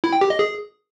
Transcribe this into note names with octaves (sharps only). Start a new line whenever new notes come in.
E4
G5
G4
D#5
G#4